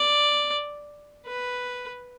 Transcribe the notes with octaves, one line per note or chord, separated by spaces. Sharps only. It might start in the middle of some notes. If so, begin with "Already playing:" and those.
Already playing: D5
B4